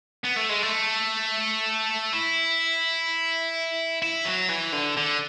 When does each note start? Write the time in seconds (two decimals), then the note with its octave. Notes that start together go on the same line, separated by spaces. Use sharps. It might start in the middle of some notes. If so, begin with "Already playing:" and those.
0.24 B3
0.36 A3
0.49 G#3
0.62 A3
2.13 E4
4.02 E4
4.26 F#3
4.49 E3
4.73 D3
4.97 D3